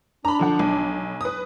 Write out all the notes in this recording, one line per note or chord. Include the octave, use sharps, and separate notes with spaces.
D4 A#5 B5
D3 F3 F#5
B1
B4 D#6